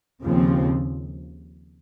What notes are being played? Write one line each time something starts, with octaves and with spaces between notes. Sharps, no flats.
D#2 C#3 F3 C4